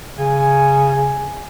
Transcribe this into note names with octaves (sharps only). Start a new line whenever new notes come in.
C#3 G#5